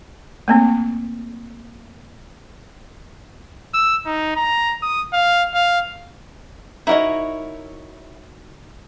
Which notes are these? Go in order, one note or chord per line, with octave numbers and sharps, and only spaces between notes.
A3 A#3 C4
E6
D#4
A#5
D#6
F5
F5
D#4 E4 F#4 A#4 C#5 D#5